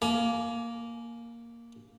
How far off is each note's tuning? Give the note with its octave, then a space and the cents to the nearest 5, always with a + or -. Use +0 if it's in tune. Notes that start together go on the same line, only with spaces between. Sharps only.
A#3 +0 G#5 +30